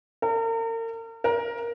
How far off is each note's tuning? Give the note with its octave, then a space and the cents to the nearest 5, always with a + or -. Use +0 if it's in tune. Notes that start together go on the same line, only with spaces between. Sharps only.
A#4 -40
A#4 +15